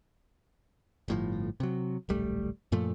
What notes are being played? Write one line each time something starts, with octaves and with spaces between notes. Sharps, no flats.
G1 A2 F3
C3 F#3
D1 A#1 G3 A3
F#2 A#2 F3 A3